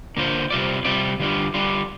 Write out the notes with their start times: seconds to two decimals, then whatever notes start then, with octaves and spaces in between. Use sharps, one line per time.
0.17 D3 A#3 F4 C5
0.50 C3 G3 C4 F4 D5
0.85 C3 G3 C4 F4 D5
1.20 D3 G3 D4 F4
1.54 D3 G3 D4 F4